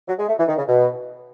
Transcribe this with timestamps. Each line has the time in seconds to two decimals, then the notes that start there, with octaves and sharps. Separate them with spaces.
0.08 F#3
0.19 G#3
0.29 A3
0.39 E3
0.48 D#3
0.58 C#3
0.69 B2